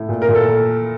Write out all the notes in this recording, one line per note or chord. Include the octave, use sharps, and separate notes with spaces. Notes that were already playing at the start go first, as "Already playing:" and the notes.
Already playing: A2
A#2
A#4
A#2
A4